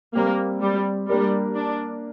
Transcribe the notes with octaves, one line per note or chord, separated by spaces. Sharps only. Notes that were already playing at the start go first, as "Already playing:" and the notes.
G3 A#3 C4 G4
G3
G3 A#3 D4 A#4 D5
D4